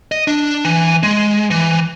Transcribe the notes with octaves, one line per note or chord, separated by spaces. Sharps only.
D#5
D4
E3
G#3
E3